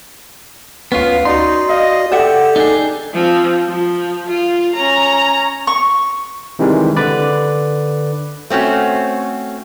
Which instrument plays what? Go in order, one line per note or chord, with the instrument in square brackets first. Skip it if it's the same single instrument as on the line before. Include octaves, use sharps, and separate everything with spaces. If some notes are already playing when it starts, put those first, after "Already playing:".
[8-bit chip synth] D2 B4 [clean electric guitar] B3 F4 [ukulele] C#4 F5
[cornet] D#4 [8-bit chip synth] F#4 D5 [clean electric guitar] C6
[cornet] D#5 [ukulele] F5
[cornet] G4 [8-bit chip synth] A4 D5 [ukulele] C5 E5 F#5
[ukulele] D4 [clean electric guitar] D#4 G#4
[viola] F3 C4
F3
F4
C#4 A#5
[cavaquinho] C#6
[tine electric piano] C3 D#3 E3 G3 G#3
D3 B4 D5
[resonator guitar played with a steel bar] A3 C4 C#4 F#4